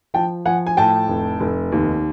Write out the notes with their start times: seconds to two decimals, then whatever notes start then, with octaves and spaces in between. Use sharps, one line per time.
0.14 F3 G5 A5
0.45 F3 F#5 G#5
0.67 G#5
0.77 A2 G5 A5
1.08 F1
1.40 F1
1.72 D#2